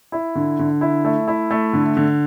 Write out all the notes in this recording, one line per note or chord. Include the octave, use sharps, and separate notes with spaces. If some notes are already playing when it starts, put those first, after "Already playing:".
E4
D3
D3
E4
A3
E4
A3
D3
D3